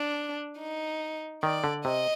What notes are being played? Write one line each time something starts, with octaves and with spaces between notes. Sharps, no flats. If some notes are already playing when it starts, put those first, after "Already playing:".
Already playing: D4
D#4
D#3 D5
D3
C3 D#5